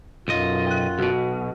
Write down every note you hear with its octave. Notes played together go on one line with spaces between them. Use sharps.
B1 F#2 F4 D#5
G5 F#6
B1 B2 F#4